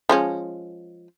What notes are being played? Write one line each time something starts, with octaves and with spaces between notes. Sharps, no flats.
F3 G#3 C#4